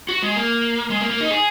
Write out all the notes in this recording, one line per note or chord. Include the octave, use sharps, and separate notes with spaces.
F#4
G#3
A#3
G#3
A#3
A#3
D#4
G#4